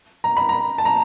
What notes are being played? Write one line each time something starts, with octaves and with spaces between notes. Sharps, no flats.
A#5
B5
A#5
A5
A#5